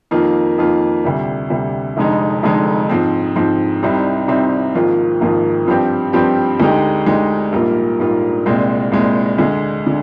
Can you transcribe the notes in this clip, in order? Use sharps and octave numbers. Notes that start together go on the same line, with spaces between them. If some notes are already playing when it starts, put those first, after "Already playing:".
F2 D#3 A#3 F4
F2 D#3 A#3 F4
D2 C3 G3
D2 C3 G3
F1 F2 D3 G#3 D#4
F1 F2 D3 G#3 D#4
G#2 F3 C4
G#2 F3 C4
C2 C3 G3 C4 D#4
C2 C3 G3 C4 D#4
G#1 G#2 F3 A#3 F4
G#1 G#2 F3 A#3 F4
G2 F3 C4 G4
G2 F3 C4 G4
D2 D3 G#3 D#4 G4
D2 D3 G#3 D#4 G4
A#1 G#2 G3 A#3 F4
A#1 G#2 G3 A#3 F4
C2 A#2 G#3 C4
C2 A#2 G#3 C4
D2 D3 G#3
D3